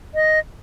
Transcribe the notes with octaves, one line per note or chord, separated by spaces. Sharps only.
D#5